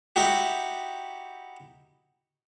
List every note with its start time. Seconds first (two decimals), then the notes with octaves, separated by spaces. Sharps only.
0.16 D#4 E4 F#4 G4